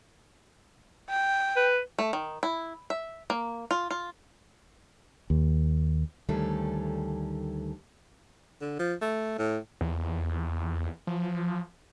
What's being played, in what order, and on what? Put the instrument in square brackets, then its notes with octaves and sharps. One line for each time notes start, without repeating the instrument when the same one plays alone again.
[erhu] G5
[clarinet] B4
[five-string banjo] A3
D#3
E4
E5
A#3
F4
F4
[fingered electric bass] D#2
[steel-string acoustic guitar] D2 D#3 G3 A3 C#4 A4
[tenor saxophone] D3
F3
A3
A2
[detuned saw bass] E2
F3